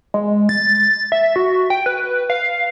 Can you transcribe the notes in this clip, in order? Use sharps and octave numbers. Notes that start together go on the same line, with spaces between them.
G#3
A6
E5
F#4
G5
B4
F5